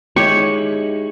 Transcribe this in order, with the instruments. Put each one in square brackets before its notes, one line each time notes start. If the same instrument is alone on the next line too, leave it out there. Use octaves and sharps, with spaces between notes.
[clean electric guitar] G#3 D#4 E4 [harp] G4 C#5 [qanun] C#6